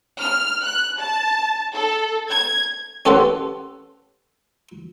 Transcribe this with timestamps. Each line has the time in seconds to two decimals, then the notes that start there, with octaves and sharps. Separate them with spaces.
0.20 F6
0.62 F#6
0.99 A5
1.73 A4
2.29 G#6
3.05 C#4 G4 A4 B4 C5 F#5